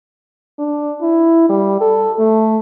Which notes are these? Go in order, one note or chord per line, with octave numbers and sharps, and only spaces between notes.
D4
E4
G3
A4
A3